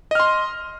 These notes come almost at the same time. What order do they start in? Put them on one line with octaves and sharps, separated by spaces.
D#5 F6 C6